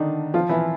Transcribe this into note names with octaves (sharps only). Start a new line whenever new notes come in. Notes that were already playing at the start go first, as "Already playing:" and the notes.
Already playing: D3 D#3 D4 D#4
F3 F4
E3 E4